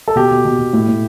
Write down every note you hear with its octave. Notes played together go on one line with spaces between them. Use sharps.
A4
B2 G4
B2
B2
B2
A2
A2